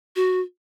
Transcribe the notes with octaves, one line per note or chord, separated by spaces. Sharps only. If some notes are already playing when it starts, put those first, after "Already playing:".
F#4